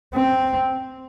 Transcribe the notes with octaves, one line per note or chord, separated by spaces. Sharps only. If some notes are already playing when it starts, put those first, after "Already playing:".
C4